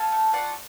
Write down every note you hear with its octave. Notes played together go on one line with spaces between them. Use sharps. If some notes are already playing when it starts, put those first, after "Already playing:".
Already playing: A4 F5 G#5
A3
F4 D5 F#5